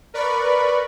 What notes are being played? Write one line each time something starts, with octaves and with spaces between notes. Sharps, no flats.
A#4 B4 D5 B5 C#6